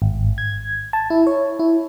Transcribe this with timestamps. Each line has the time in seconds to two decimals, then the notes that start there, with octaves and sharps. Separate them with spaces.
0.02 G#1
0.38 G#6
0.93 A5
1.10 E4
1.27 C#5
1.59 E4